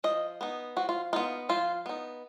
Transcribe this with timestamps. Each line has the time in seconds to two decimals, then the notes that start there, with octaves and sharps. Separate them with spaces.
0.04 F3 D#5
0.41 B3 D#4
0.76 F3 F#4
0.89 F4
1.13 B3 D#4 F4
1.49 F3 F4
1.86 B3 D#4